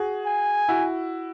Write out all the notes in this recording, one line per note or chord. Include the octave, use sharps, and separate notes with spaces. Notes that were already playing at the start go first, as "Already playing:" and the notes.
Already playing: F#4 G#4
G#5
E4 F#4